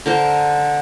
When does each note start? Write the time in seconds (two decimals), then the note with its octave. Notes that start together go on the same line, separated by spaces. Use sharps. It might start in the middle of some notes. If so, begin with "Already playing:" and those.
0.06 D3 A#4 C5